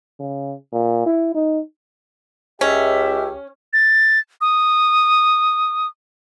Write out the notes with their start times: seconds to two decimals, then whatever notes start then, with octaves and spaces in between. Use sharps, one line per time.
0.19 C#3
0.72 A#2
1.06 E4
1.34 D#4
2.61 C#2 C#4 G4 D#5 E5
3.73 A6
4.41 D#6